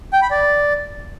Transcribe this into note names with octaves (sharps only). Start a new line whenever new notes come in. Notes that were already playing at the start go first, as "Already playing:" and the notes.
G5
B5
D5